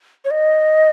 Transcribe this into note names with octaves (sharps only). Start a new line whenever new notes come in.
C#5
D#5